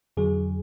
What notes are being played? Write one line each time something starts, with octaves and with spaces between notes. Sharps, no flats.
F2 D3 F#3 G#4